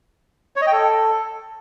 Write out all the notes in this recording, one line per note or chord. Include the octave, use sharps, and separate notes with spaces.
C#5
D#5
G5
A4